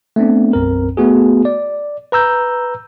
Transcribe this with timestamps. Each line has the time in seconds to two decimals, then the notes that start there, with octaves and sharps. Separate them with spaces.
0.16 A3 B3 C4 D4
0.53 B1 F#2 C4 A#4
0.97 A3 B3 F#4 G#4
1.45 D5
2.12 B4 A#5 E6 G6